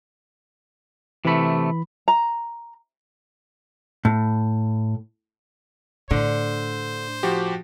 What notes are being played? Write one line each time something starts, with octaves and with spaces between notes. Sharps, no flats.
C3 E3 A3 B5
A#5
A2
A2 D3 C5
F3 F#4 G4